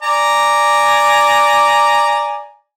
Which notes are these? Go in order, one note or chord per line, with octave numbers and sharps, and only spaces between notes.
D5 G#5 A#5